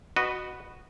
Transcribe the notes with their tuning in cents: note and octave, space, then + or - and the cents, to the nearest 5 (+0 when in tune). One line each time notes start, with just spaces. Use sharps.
F#4 +0 B4 +0 D#5 -20